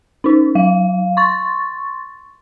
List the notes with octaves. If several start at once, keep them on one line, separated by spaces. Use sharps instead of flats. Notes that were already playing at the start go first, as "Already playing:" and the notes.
C#4 D#4
F#3 F5
C6 C#6 A6